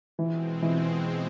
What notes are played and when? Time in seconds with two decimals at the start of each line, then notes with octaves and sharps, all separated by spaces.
0.18 B2 E3 G#3 C4
0.62 E3